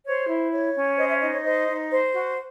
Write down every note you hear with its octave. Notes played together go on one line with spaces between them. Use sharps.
C5 C#5
E4
C#5
C#4
C5 D#5
E5
D#4 D#5
C#5
C5 D#5
D#4
C5
F#4